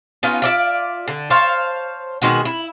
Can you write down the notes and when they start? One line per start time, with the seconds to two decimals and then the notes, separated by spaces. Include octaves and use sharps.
0.23 B3 C#4 D#4 F4
0.42 F4 D5 E5
1.08 D3
1.30 C5 C#5 F5 A5
2.22 B2 D#3 G#3 F#4
2.45 E4